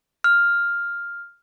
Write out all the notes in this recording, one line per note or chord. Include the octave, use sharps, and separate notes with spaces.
F6